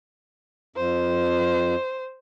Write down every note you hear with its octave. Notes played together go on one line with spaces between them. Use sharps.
F2 C5